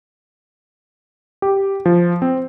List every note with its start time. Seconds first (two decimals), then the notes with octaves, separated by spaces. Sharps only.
1.42 G4
1.86 F3
2.22 C4